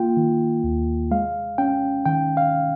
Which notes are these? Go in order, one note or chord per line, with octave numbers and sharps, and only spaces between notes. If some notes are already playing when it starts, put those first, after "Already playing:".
Already playing: A#3 F4 G5
D#3
D#2
G#3 F5
C#4 G5
D#3 G5
F5